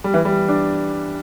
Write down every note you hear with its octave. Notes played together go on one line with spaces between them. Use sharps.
G3
E3
G3
D4